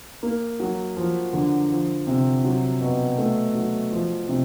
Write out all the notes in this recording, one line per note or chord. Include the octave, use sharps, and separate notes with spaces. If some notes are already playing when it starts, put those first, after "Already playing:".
A#3
F#3
F3
D3
F3
C3
F#3
B2
A3
F#3
F3
C3